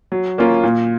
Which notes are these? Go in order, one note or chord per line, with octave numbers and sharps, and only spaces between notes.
F#3
A#3 C#4 F4 A#4
A#2